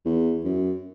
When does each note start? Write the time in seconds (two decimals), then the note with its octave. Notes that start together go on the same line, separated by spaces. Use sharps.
0.05 E2
0.44 F#2